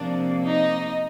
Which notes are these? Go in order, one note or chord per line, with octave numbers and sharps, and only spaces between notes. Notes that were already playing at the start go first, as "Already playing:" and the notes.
Already playing: C3 F3 A#3 D4 D5
D#4 D#5